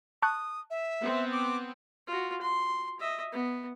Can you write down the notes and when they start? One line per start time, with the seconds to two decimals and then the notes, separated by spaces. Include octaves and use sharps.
0.22 A5 C#6 D#6 F#6
0.70 E5
1.00 B3 C4
1.32 D6
2.07 F4 F#4
2.41 C6
3.00 D#5 E5
3.32 B3